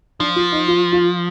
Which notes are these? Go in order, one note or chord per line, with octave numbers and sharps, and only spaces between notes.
F3 D4
F4
D#4
F4
F4